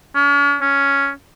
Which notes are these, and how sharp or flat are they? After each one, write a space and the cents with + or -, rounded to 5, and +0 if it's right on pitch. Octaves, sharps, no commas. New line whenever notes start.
C#4 +45
C#4 +5